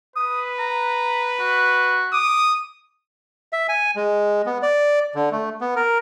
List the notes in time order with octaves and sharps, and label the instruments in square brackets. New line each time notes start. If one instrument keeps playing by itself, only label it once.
[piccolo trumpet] B4 [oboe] D#6
[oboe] A#5
F#4
[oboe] D6 [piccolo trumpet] D#6
[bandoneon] E5
G#5
G#3
B3
D5
D3
A3
B3
A#4